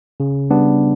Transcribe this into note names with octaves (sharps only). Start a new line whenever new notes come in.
C#3
G3 B3 D4